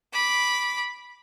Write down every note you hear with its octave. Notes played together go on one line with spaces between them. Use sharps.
B5 D6